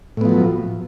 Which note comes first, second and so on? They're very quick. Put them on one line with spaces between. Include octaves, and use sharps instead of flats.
A2 B3 F3 F#3